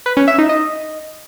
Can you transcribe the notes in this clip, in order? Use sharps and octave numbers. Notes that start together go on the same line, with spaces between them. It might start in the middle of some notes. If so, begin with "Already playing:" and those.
B4
C#4
E5
D#4
D#5